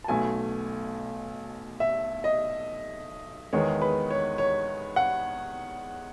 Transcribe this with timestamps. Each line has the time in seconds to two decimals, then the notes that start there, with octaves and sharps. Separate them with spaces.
0.04 A5
0.08 B1 B2 A3 G#5
1.80 E5
2.24 D#5
3.53 E2 D#3 G#3 B3 C#5
3.82 B4
4.10 C#5
4.38 C#5
4.96 F#5